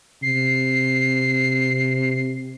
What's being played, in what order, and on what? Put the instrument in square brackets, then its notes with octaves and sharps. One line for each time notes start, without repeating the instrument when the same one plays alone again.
[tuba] C3 [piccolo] C7